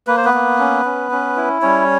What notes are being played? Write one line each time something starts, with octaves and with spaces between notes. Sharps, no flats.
A#3 B4
C5
B3 B4
A#3
C#4
C#4
C#4
E4
G3 C#4 C#5